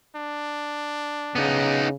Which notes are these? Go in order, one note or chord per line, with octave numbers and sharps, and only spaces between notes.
D4
C#3 B3 D#4